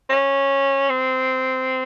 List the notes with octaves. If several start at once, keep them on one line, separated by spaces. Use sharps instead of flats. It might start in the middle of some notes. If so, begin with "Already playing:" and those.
C#4
C4